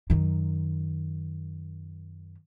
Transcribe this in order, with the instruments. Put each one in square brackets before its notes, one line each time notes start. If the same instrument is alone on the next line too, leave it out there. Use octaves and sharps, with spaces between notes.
[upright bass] F#2 D#3